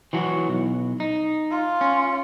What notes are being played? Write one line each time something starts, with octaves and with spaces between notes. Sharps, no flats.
E3 F#3 F#4
B1
D#4
F4
C#4